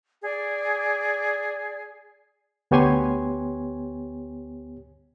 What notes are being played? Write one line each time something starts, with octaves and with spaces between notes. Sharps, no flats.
G#4 D5
D2 B3 G4 C#5 G#5 C6